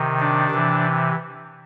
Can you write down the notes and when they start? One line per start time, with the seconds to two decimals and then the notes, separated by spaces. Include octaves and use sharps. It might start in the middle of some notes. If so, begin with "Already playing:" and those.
Already playing: C3 D#3
0.20 D4
0.51 C3 E3